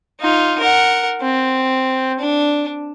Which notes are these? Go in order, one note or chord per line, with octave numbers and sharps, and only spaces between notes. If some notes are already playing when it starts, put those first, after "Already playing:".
D#4 F4
A#4 F#5
C4
D4